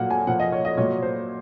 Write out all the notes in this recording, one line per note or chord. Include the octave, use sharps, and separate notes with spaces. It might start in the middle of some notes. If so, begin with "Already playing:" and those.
Already playing: A#2 F#3 A#3 F#5
G#5
A#2 F3 A#3 F#5
D#5
C#5
D#5
A#2 F#3 A#3 C#5
C5